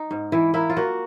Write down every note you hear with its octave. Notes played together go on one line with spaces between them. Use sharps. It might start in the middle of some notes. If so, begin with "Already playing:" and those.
Already playing: D#4
G#2
E3 E4
A#3 E4
F4
A#3 F#4